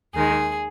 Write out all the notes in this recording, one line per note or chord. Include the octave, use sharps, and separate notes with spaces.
D#2 D#3 G#3 G#4